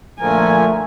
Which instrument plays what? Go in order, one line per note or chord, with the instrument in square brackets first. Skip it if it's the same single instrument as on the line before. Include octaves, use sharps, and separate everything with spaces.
[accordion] A#2 D3 F3 [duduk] A3 [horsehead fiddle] A#4 G#5